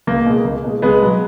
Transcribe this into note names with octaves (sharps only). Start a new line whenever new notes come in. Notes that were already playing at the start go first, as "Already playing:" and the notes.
C#2 A#3
B2 G#3
C#2
B2 G#3
C#2 G#3 B3
B2 F#3